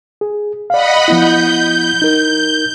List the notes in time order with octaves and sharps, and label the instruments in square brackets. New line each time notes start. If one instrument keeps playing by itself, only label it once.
[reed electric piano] G#4
[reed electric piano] D5 F5 [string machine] D#5 F#5 B5
[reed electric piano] F3 B3 E4 [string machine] G6
[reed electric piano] D#4 A#4